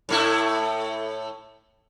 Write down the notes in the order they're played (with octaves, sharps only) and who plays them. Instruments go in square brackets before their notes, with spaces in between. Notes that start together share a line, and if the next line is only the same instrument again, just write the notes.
[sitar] A2 A3 E4